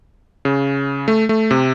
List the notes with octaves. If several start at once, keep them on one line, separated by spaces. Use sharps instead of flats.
C#3
A3
A3
C3